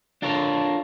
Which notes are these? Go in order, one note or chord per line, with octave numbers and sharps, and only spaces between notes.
D4 F4 A4 A#4 C#5